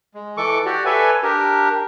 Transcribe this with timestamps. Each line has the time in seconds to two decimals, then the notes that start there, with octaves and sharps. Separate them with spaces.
0.14 G#3
0.37 E3 A4 C#6 D6
0.66 F#4 G4 D5
0.86 A4 B4 C#5 D5 E5 G#5
1.23 D4 G4 A#4